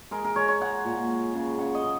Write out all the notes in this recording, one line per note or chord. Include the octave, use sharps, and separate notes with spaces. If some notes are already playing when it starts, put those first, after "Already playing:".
G#3 A#4
A#4
G#3 C#5
C#5
G#3 F#5
A#2
G#3
C#3
C#3 F#5
D#5
C#3